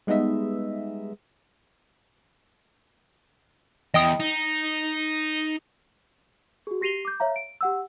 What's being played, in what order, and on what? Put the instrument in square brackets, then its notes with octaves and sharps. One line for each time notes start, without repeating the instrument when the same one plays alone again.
[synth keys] G3 G#3 B3 D#4 D#5 E5
[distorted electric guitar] E2 [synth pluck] D#5 G5 D#6
[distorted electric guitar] D#4
[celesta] F#4 G#4
G4 A#6 C7 D#7 F7 G7
D6 G6
C#5 E5 F5 A#5
D7
G4 F#5 E6